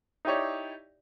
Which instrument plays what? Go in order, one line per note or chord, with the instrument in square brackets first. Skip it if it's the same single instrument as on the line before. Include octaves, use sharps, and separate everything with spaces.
[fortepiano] D#4 E4 G4 C#5 D5